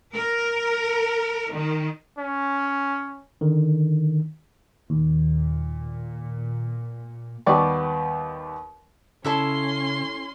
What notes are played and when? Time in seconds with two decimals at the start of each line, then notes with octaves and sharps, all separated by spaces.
0.16 A#4
1.55 D#3
2.18 C#4
3.41 D3 D#3
4.90 D#2 A#2
7.46 D#2 G3 B3 D5 G5 C#6
9.25 C#3 C#4 E4 A4 A5 C6